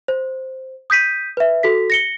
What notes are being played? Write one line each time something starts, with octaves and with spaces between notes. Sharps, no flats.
C5
D#6 G6 B6 D#7
B4 E5
F#4 A4 B6
A#6 C#7 G7